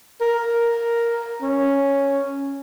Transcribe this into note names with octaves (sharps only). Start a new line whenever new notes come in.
A#4
C#4